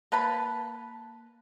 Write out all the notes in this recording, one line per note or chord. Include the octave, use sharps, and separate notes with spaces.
A#3 B4 A5 B5